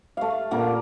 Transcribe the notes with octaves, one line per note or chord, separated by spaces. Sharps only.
A3 F5
A#2 D3 A#3